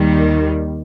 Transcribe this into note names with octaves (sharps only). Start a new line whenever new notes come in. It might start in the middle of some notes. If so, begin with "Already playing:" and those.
Already playing: D#2 D#3 G3